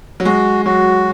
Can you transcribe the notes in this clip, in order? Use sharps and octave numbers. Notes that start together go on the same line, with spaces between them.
F#3
G#3 F#4
F#3 F#4